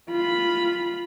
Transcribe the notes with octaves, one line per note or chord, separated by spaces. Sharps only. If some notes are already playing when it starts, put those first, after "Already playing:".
F4 B5